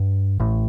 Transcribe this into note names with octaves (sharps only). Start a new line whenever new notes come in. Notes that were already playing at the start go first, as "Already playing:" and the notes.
Already playing: G2
A1 A2